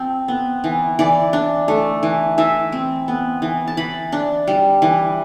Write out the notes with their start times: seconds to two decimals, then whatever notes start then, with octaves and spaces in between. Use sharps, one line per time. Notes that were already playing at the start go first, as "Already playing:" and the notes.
Already playing: F3 C4
0.28 B3
0.64 E3
0.99 E3 D5
1.33 D4
1.68 A3
2.03 E3
2.38 E3 E5
2.72 C4
3.08 B3
3.42 E3
3.68 A5
3.77 E3 B5
4.12 D4
4.48 G3
4.82 E3